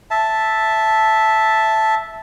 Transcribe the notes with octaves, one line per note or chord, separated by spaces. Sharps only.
E5 A5